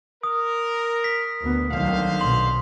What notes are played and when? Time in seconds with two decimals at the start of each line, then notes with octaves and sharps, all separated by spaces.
0.23 A#4 D#6
1.04 B6
1.40 D2 B3
1.71 C2 D3 D#3 F#3 C5 F5
2.21 B1 B2 C6